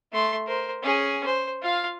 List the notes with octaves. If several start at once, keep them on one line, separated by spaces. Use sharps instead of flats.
A3 C6
A#4 C5
C#4 G#4
C5
F4 F5